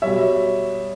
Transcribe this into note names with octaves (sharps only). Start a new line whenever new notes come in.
B2 G3 C#5 E5